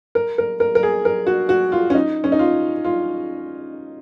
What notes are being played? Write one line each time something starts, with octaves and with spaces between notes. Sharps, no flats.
A#4
A#4
A#4
A#4
G#4
A#4
F#4
F#4
F4
C#4
D#4
C#4
D#4
F4
F4